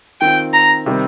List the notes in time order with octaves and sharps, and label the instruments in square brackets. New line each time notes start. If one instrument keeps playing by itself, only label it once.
[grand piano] D#3 C4 F4 [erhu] G5
[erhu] A#5
[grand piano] C3 D#3 G3 C4